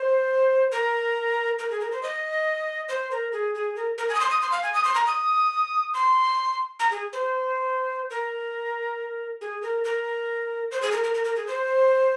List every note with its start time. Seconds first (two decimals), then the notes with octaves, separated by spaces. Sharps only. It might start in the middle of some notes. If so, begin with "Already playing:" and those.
Already playing: C5
0.72 A#4
1.59 A#4
1.70 G#4
1.81 A#4
1.92 C5
2.03 D#5
2.89 C5
3.11 A#4
3.33 G#4
3.55 G#4
3.76 A#4
3.98 A#4
4.09 G#5
4.15 D#6
4.20 C6
4.30 D#6
4.41 C6
4.52 F5
4.63 G#5
4.74 D#6
4.85 C6
4.95 A#5
5.07 D#6
5.94 C6
6.80 A#5
6.91 G#4
7.13 C5
8.10 A#4
9.41 G#4
9.62 A#4
9.84 A#4
10.71 C5
10.82 G#4
10.92 A#4
11.04 A#4
11.14 A#4
11.25 A#4
11.36 G#4
11.47 C5